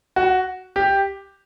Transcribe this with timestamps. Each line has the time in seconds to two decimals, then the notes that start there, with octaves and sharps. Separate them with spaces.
0.16 F#4
0.76 G4